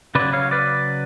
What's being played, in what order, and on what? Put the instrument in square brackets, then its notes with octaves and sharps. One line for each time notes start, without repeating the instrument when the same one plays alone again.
[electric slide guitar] C#3 F#3 B4 D5
C#5 F5
B4 D5